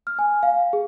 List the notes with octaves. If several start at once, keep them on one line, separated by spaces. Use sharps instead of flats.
F6
G#5
F5
G#4